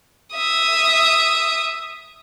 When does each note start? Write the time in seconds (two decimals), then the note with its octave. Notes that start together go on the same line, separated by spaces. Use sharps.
0.36 E5 D#6